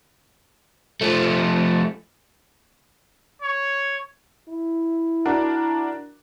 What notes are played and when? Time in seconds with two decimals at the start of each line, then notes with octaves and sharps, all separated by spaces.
1.01 F3 A3
3.42 C#5
4.49 E4
5.25 D4 F#4 A#4